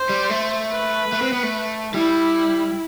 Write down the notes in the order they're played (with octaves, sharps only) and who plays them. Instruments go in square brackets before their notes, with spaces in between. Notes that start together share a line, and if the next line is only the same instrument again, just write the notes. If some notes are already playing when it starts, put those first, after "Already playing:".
Already playing: [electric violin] C5
[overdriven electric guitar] G3
A3
[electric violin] B4
[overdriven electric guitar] A3
C4
B3
A3
[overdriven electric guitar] G3 [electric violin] E4